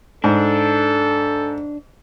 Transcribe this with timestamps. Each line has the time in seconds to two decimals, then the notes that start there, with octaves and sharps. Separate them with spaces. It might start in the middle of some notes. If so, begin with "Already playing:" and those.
0.24 G#2 D4 A4